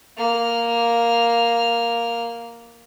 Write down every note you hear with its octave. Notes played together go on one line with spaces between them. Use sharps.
A#3 F6